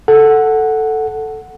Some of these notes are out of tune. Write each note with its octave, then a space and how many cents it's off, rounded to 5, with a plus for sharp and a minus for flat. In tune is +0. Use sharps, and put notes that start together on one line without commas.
A4 +0 F#5 +0